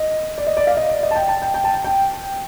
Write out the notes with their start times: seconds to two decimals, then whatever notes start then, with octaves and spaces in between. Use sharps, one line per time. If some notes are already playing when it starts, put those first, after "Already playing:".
Already playing: D#5
0.38 D5
0.47 D#5
0.57 D5
0.67 F5
0.77 D#5
0.89 D5
1.03 D#5
1.11 A5
1.15 G5
1.28 A5
1.42 G5
1.54 G5
1.64 A5
1.74 G5
1.84 G5